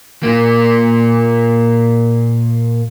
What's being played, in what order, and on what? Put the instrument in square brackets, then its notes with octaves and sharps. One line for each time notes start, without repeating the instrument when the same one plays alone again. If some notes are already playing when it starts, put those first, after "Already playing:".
[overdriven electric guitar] A#2 A#3